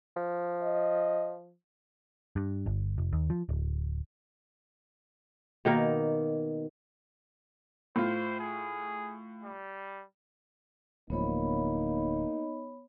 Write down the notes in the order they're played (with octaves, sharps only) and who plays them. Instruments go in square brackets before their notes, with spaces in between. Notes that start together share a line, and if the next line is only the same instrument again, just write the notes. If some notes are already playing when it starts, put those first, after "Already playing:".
[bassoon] F3
[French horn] D#5
[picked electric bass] G2
G1
F1
D#2
F3
D1
[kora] B2 D#3 A#3
[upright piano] A2 F4 [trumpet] C5
[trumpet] G#4
G3
[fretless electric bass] D1 D2 F3 [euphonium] A#3 [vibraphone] B3 C#5 B5 [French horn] D#4